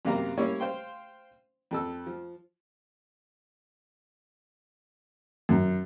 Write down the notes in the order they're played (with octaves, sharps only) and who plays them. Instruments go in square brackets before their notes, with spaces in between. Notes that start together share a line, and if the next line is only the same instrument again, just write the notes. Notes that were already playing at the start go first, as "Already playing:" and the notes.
[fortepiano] F#2 C3 A#3 B3 F5 A#5
G3 A#3 C#4 E4 C#5
C5 F5 G5 C6
F2 A4 E6
F3
F#2